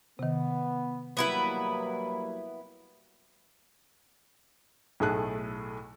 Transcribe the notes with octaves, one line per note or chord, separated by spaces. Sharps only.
C3 D#3 B3
F#3 G3 A#3 B3 E4 B4
B1 A2 A3 G#4 A5 F#6